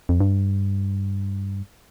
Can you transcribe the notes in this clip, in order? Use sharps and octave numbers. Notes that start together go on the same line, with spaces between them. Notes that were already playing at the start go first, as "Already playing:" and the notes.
F2
G2